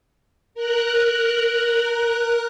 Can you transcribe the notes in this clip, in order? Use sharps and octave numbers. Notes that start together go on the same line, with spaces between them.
A#4 F#6